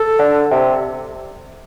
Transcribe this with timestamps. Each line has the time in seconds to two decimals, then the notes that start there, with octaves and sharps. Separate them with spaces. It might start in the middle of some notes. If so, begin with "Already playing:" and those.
Already playing: A4
0.19 D3
0.51 C3